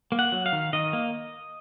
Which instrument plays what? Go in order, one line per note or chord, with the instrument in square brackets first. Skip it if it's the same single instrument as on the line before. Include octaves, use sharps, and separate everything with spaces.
[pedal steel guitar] A#3
F#5
F#3
F5
D#3
D#3 D#5
A#3